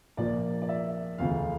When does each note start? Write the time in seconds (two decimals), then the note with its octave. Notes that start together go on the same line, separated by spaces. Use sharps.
0.17 A#1 A#2 F3 A#3 D5
0.62 D5
0.69 E5
1.18 E1 D2 D3 F3 F5